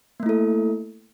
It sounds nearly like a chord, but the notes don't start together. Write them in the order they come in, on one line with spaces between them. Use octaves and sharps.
A#3 A3 E4 A4